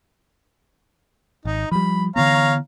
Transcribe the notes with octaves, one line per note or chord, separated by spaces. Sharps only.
G#1 D#4
F3 G3 B5
D3 E3 B3 C#5 F5 A#5